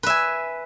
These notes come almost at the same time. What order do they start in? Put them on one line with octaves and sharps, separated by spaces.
B4 E5 G#5